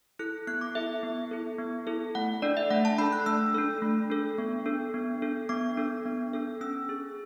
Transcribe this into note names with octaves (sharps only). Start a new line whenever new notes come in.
E4 A4 F#6
B3 F#6
D6
E4 A4 E5
B3
E4 A4
B3
E4 A4
A3 F#5
D4 A4 D5
E5
A3 F#5
A5
D4 A4 B5
F#6
A3 E6
D4 A4
A3
D4 A4
B3
D4 A4
B3
D4 A4
B3 D6
D4 A4
B3
D4 A4
C#4 E6
G#4